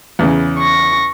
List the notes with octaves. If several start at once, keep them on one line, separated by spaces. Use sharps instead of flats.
E2 C#3
C#6 A#6